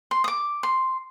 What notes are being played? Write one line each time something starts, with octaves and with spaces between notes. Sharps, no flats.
C6
D#6
D6
C6